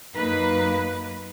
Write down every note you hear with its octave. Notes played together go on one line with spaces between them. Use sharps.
F#2 A#3 D#4 B4